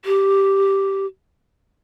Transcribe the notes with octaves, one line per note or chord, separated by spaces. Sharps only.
G4